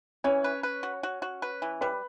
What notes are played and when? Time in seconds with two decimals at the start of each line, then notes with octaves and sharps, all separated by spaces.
0.24 E3 C#4 C#5
0.44 B4
0.63 B4
0.83 F#4
1.03 F#4
1.22 F#4
1.42 B4
1.62 E3
1.81 G3 B4 B5